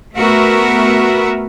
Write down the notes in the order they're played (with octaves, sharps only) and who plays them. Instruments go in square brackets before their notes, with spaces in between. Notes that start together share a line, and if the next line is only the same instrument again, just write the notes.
[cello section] A3 B3 F#4 A#4 B4 E5